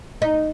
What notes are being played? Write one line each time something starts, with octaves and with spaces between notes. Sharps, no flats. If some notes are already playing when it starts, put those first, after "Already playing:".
D#4